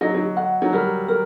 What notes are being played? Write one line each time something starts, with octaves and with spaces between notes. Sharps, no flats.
F#3 D#5
F#3
F#5
F#3
G3 A#4
A#4